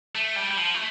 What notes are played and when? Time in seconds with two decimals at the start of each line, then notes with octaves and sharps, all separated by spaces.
0.15 A3
0.36 G3
0.51 G3
0.57 F3
0.75 A3